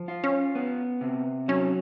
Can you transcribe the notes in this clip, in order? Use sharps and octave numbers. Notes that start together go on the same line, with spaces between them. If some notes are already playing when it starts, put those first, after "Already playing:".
Already playing: F3
F4
C#4
B3
C3
F#3 C#4